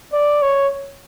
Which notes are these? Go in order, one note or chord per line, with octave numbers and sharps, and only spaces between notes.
D5
C#5